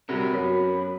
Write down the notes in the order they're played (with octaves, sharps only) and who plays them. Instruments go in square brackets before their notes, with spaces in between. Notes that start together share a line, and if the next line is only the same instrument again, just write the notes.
[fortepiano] C3 G3 [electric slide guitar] F#4 A#4 [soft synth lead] B5
[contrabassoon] F#2 [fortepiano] B3 B4